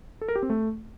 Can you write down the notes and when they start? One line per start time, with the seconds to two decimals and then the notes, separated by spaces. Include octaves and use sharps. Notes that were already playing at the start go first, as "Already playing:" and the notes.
0.21 A4
0.28 A#4
0.36 G4
0.43 C4
0.50 A3